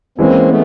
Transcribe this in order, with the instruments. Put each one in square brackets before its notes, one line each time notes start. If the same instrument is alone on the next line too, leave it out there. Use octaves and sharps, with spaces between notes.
[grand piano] E3 G#3 C#4 [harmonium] A#3 C4
[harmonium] A3 B3